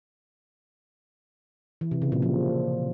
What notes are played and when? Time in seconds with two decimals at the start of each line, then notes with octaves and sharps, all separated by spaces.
1.81 E3
1.91 C3
2.02 C#3
2.12 A#2
2.22 F3